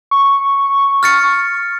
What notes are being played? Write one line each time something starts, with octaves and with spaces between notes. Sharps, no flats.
C#6
F6 A6 C#7